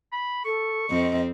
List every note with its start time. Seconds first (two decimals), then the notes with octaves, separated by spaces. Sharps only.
0.12 B5
0.45 A4 C#6
0.89 F2 C4 D#5